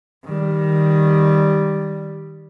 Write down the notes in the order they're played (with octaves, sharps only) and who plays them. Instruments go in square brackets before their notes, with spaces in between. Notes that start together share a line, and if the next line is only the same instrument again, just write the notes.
[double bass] D#3 G3